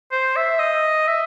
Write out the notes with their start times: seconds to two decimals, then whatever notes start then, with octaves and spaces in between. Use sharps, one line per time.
0.12 C5
0.36 E5
0.59 D#5
1.08 E5